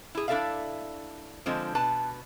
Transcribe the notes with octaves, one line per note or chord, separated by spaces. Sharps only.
E4 G#4
D4 E4 A4 D5 E5 F5
D3 F3 G#3 C4
B2 B4 A5